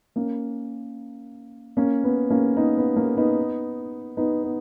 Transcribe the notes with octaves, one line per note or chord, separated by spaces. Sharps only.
A#3 C#4
A#3 C#4
B3
A#3 C#4
B3 D#4
B3
A#3 C#4
B3 D#4
B3 D#4
B3